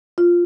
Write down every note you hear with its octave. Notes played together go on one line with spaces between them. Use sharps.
F4